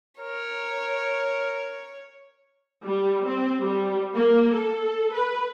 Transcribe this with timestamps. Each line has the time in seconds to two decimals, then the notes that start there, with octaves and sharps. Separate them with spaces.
0.20 A#4 C#5
2.85 G3
3.27 C4
3.63 G3
4.14 A#3
4.54 A4
5.14 B4